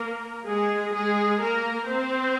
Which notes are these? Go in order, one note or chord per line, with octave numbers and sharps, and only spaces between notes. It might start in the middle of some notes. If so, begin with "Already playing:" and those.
Already playing: A#3 A#4
G#3 G#4
G#3 G#4
A#3 A#4
C4 C5